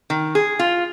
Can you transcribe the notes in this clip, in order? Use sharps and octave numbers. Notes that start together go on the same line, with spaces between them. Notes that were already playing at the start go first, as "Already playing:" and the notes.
D#3
G#4
F4